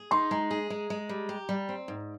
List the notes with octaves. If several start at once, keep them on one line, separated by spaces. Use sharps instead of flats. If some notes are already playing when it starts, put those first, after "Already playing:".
Already playing: G#4
D#4 C6
G#3 A#5
G#4
G#3
G#3
G3
G4
G3
C4
G#2